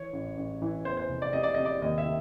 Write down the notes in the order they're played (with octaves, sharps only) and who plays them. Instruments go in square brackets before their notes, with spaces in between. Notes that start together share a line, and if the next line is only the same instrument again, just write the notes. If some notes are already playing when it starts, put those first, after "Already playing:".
Already playing: [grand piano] E3 C#5
A1
A1
E3
E2 C5
C5
F1
D5
C3 D#5
D5
C3 D#5
D5
D#2 D#5
E5
D#3